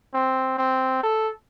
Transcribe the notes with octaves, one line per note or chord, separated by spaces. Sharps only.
C4
C4
A4